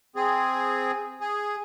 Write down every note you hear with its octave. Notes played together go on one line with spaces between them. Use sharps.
C4 G#4
G#4